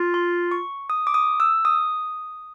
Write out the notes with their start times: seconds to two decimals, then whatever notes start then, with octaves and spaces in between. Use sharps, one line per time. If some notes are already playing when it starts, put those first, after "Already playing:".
Already playing: F4
0.14 C6
0.51 C#6
0.90 D#6
1.07 D6
1.14 D#6
1.40 E6
1.65 D#6